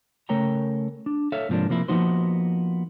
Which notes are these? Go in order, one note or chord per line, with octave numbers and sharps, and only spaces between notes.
C#3 A3 A#4 C#5 G5 A#5
D4
A4 C#5 E5 F5
G#2 C3 F3 A#3 D4
C3 F3 A#3 E4
F3 A#3 B3 D#4 F#4 C5